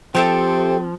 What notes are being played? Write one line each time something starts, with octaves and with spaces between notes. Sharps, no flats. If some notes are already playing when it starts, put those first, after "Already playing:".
F3 C4 G4 A4 E5